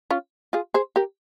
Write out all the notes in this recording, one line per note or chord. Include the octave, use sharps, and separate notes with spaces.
C#4 F4
F4 G#4
G#4 C5
G4 A#4